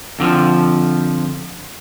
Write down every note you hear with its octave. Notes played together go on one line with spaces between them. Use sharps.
F2 D3 E3 F3